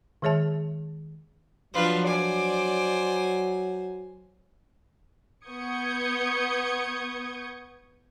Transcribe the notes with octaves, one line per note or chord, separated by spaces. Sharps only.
D#3 G#3 G#4 C#5 E5 A5
F3 F#3 D4 F4 B4
C5 D5 G#5
B3 C#6 D#6 G6 G#6 C#7